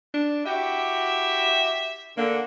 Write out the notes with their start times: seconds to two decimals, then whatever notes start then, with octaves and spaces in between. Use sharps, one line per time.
0.14 D4
0.45 E4 F#4 G4 E5
2.17 D3 A#3